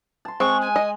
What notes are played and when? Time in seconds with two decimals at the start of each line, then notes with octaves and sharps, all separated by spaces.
0.25 A5 C6
0.40 G#3 C4 C#6
0.61 G#5
0.76 D#5